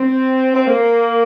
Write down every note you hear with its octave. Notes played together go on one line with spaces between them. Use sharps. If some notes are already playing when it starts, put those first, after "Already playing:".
Already playing: C4
C4
A#3